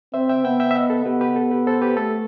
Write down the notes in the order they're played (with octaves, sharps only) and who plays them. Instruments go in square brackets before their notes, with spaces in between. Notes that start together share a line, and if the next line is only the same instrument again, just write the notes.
[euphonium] C4 [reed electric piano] C5 E5
[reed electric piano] E5 G5
[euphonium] B3 [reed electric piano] E5 G5
[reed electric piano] E5 G5
E5
D#5 F#5
A4
[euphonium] B3 [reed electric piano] G4 B4
[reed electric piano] G4 B4
A4
G4 B4
A4 C5
G4 B4
[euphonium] A3 [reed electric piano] A4